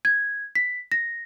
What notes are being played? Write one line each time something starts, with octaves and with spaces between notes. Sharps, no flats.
G#6
B6
A#6